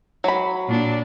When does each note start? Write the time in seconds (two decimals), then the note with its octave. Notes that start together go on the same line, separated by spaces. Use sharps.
0.24 F#3 B5
0.67 A#2 D4